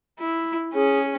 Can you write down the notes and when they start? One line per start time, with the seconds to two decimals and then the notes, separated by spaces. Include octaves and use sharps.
0.19 E4
0.74 C#4 G#4